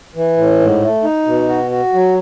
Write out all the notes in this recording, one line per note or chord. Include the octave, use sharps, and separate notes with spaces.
E3
A2
G#2
A3
D#4
B2
F#4
F#4
F#3